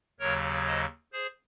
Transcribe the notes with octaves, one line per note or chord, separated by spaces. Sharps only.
D#2 C#3 F#3 A#4 C#5
C5 D#5
G#4 C5